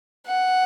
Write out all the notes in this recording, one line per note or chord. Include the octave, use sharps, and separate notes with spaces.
F#5